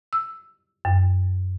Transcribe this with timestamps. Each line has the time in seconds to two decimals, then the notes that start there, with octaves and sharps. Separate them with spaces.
0.13 E6
0.85 F#2